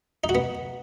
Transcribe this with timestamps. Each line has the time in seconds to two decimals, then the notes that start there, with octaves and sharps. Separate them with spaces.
0.24 D#4
0.29 F#4
0.35 B3